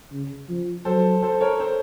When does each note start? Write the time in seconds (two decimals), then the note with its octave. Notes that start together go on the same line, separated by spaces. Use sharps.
0.12 C#3
0.49 F3
0.85 F#3 A4 C5
1.22 A4 C5
1.41 A#4 C#5
1.60 A4 C5